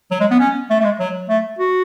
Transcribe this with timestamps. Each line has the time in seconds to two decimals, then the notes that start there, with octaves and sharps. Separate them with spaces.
0.11 F#3
0.20 G#3
0.31 B3
0.40 C#4
0.70 A3
0.80 A3
0.84 G#3
0.99 F#3
1.29 A3
1.59 F#4